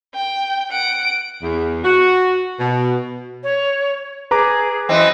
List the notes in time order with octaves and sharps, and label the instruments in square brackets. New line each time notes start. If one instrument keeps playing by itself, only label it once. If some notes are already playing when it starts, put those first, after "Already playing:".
[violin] G5
F#5 D7
[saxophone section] E2
F#4
B2
[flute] C#5
[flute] G#4 [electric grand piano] B4 A#5 D6
[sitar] F#2 E3 C4 [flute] D#5